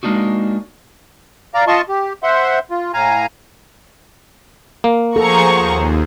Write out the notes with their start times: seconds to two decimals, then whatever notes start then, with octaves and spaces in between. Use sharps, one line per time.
0.03 G#3 A#3 D4 D#4 F#4
1.54 D5 F5 A#5
1.67 F4 D#5 A5 C6 C#6
1.89 G4
2.23 C5 E5 F#5 C6
2.71 F4
2.94 A2 F5 G#5 A#5
4.84 A#3
5.16 F3 G#4 A4 C5 F#5 A#5 C#6
5.55 D#2